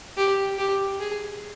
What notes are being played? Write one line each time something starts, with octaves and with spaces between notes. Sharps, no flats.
G4
G4
G#4